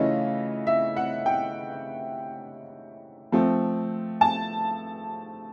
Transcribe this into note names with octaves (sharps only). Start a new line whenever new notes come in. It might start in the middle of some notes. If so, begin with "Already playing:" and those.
Already playing: C#3 E3 A3 C#4 F4 D#5
E5
F#5
G5
F3 A3 C4
A5